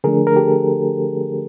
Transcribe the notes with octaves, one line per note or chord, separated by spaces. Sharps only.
D3 F3 A3 D4 G#4 A#4
A#4
G4 A4